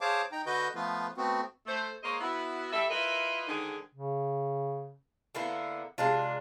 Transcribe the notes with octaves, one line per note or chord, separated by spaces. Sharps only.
G#4 C5 C#5 F5 A5 D6
D#4 G5 A#5
D3 F#4 B4 D#5 G6
F3 A3 B3 F4 B4
A3 B3 C4 F#4
A3 C5
G#3 A#3 C5 C#5 D#5
B3 E4 F#4
G3 A4 E5
E4 F4 A#4 B4 D#5 E5
G#2 D3 D#3 G#4
C#3
D3 A#3 B3 E4
C3 G#3 D4 F4